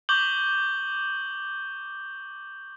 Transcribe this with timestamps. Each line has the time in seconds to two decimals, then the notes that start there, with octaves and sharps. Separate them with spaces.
0.09 C#6 D6 G6 F#7 G7